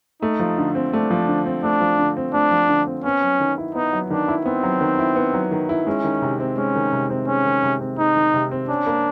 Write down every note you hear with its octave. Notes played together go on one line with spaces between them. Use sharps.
A3 D#4
F3
D3
C4
A3 D4
F3
D3
C4
A3 D4
F3
D3
C4
A3 D4
F3
D3
C4
B3 C#4
F#3
D#3
E4
B3 D#4
F#3
D#3 D4
E4
B3 C4
F#3
D#3
E4
B3
F#3
D#3
E4
G#3 C#4
D#3
C3
C4
G#3 C#4
D#3
C3
C4
G#3 C#4
D#3
C3
C4
G#3 D#4
D#3
C3
C4
C#4 D4
A#3